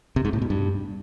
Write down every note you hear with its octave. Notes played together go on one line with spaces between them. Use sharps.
C3
G#2
A2
B2
G2